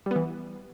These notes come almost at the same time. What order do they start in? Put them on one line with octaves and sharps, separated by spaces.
G3 B3 E3